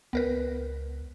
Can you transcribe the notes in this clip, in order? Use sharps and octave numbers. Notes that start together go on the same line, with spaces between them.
C#2 B3 A#4 B4